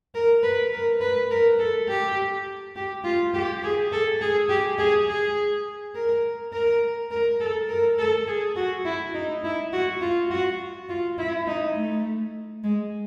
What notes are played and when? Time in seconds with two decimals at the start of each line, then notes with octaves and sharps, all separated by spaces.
0.15 A#4
0.43 B4
0.72 A#4
1.01 B4
1.31 A#4
1.59 A4
1.88 G4
2.76 G4
3.04 F4
3.34 G4
3.63 G#4
3.92 A4
4.21 G#4
4.49 G4
4.78 G#4
5.08 G#4
5.95 A#4
6.53 A#4
7.11 A#4
7.40 A4
7.69 A#4
7.99 A4
8.27 G#4
8.56 F#4
8.85 E4
9.14 D#4
9.44 E4
9.73 F#4
10.01 F4
10.30 F#4
10.89 F4
11.18 E4
11.47 D#4
11.76 A3
12.63 G#3